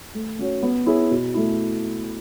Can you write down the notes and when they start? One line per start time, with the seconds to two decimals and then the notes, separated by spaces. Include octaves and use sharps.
0.14 A3
0.39 C#4 F#4 C#5
0.62 B3
0.86 E4 G#4 C#5
1.11 B2
1.34 A3 E4